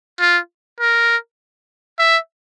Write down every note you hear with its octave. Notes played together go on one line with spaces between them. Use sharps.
F4
A#4
E5